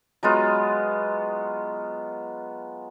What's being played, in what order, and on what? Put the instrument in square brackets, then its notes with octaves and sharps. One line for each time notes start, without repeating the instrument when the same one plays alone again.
[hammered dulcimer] F#3 G#3 B3 F4